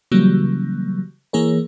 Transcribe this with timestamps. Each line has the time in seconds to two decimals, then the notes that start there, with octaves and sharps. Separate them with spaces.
0.12 C#3 E3 F#3 G3 A#3
1.33 E3 A#3 G#4 A#4 C#5